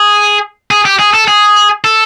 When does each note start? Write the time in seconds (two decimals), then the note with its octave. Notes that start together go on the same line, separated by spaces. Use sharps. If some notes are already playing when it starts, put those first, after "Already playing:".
Already playing: G#4
0.71 G#4
0.85 G4
0.99 G#4
1.14 A4
1.28 G#4
1.84 A4